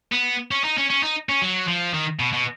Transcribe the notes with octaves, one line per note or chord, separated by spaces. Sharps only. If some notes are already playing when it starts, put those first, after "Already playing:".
B3
C#4
D#4
C#4
C#4
D#4
C#4
F#3
F3
D#3
B2
B2